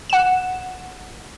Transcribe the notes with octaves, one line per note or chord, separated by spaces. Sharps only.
F#5 E7